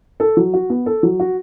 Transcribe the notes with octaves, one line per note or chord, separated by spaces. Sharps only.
A4
F#3
F#4
B3
A4
F#3
F#4